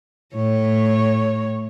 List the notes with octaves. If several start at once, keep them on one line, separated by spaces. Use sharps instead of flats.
A2 C#5